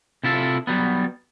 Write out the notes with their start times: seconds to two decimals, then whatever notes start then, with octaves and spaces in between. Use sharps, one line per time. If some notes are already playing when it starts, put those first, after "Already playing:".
0.23 C3 E4 F4 A4
0.67 F#3 G3 B3